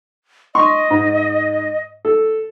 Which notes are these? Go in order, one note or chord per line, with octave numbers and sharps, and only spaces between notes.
D#5 C6 C#6
G#2
A4